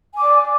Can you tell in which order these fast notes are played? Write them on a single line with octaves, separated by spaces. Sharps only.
G#5 D6 D5